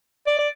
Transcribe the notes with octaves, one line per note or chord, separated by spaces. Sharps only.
D5
D5